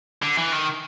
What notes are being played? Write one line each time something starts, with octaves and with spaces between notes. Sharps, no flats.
D3
E3
D#3